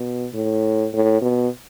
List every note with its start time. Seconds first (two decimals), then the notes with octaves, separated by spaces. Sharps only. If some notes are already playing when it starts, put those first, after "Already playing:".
Already playing: B2
0.34 A2
0.93 A2
1.21 B2